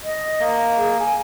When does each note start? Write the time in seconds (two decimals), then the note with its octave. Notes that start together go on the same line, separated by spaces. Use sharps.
0.03 D#5
0.40 A#3
0.76 G#4
0.99 G#5